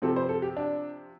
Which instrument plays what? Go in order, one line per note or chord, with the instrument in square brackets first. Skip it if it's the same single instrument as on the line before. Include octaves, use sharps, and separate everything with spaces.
[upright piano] C3 F3 C4 A4
C5
A4
G4
D4